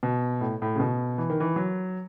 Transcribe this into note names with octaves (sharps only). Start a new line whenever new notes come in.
B2
A2
A2
C#3
B2
E3
D#3
E3
F#3